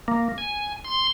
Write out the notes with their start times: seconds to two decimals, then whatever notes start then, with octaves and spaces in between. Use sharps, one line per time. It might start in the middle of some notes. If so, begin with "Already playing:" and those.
0.08 A#3
0.38 G#5
0.84 C6